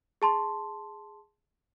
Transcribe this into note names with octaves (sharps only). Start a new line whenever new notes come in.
G#4 A5 C6